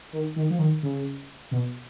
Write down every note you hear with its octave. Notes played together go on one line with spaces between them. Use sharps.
D#3
D#3
F3
D#3
C#3
B2